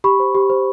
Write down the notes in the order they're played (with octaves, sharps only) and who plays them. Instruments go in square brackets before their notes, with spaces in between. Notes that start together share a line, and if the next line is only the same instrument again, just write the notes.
[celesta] G4 B5 C#6
C5
G4
C5